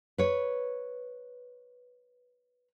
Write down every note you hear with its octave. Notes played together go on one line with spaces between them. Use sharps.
B4 C#5